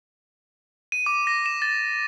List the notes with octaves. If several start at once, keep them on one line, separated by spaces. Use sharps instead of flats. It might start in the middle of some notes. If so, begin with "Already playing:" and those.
D#7
D6
A#6
E7
A6